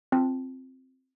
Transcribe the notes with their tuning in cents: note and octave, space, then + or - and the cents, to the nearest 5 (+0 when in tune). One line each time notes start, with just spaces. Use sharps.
C4 +0 F4 +0 A5 -5